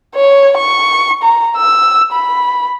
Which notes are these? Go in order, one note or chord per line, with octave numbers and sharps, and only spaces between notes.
C#5
C#6
A#5
E6
B5